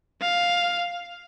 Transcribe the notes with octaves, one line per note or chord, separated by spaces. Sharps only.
F5